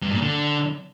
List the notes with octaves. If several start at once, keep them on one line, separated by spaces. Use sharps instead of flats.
G2
A#2
D3